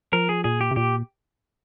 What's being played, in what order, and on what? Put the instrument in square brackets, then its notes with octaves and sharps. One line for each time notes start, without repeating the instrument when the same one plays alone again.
[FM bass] F3 [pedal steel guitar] A#4
[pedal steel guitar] G#4
[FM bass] A#2 [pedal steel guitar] G#4
[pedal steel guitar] G4
[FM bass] C3
[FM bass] A#2 [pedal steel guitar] G4